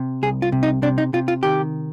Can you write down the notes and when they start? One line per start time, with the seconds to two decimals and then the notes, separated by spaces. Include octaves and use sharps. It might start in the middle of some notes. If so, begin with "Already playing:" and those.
Already playing: C3
0.23 C2 G#4
0.42 F4
0.52 C3
0.63 D#4
0.82 C3 D4
0.98 D#4
1.13 C3 F4
1.28 F4
1.43 D#3 G4